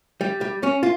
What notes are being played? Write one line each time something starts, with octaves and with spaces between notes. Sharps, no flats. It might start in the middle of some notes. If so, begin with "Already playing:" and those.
G3
G3
C#4
F4